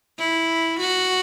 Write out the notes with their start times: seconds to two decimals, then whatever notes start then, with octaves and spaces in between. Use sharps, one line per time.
0.18 E4
0.79 F#4